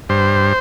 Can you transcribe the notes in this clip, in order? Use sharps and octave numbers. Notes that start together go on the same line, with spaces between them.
G2 C5